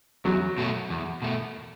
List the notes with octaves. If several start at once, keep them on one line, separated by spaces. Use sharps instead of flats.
E2 F#3
B2 A3
E2
B2 A3